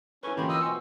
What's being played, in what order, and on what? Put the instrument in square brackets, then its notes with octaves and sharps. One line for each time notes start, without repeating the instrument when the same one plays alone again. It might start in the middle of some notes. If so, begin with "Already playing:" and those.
[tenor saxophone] C#4 [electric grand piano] E4 A4 B4 [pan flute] C#6
[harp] E3 A#3 C4 [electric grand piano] C#4 F4 [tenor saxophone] G4 [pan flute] B5
[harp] F4 [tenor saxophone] D#5 [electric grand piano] G5 [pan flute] E6
[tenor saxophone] B2 [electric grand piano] G#5 C6 C#6 [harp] C#7